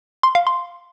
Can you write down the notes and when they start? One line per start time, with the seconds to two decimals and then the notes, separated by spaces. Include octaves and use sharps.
0.23 C6
0.35 F5
0.47 C6